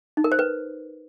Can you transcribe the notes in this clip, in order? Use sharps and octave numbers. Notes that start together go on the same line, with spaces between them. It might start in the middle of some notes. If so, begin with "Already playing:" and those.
D#4
A#4
C5
B4